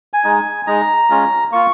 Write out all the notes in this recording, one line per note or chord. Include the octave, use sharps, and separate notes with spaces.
G#5
G#3 D#4
G#3 D#4 A#5
G#3 C#4 F4
A#3 F4 C#6